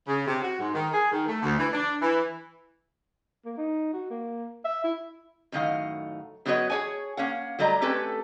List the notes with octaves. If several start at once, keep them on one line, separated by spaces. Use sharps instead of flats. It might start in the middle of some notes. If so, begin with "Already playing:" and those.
C#3
C3
F#4
G#2
D#3
G#4
D#3
A3
D2
E3
D4
E3
A#3
D#4
F#4
A#3
E5
E4
F#2 A2 D#3 D#5 F5 F#5
F#2 B3 F#4 B4 C#5 D#5
G#4 C#5 G#5
A#3 C#4 F5 F#5
F#3 G3 A3 D#5 A#5
A3 C4 C#4 G4 A4 B4